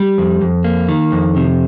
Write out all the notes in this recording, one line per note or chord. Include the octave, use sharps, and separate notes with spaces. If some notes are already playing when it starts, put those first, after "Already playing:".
Already playing: G3
F2
F2
A#3
D#3
F2
C3